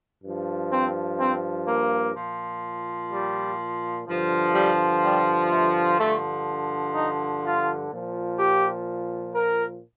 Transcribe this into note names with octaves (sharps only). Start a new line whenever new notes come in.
G2 F3
C4
C4
A#3
A#2 F3
G3
G2 D3 F3
G3
G3
A3
G2 D3 F3 A3
D#4
F4
A#2 F3
G4
A#4